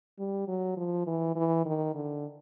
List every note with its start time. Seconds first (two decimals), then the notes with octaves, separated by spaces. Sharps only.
0.19 G3
0.48 F#3
0.77 F3
1.07 E3
1.35 E3
1.65 D#3
1.95 D3